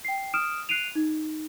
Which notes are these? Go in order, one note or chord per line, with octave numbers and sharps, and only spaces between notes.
G5 C7
D#6 F6 D7 E7
F#6 C7 D7 D#7 F7
D#4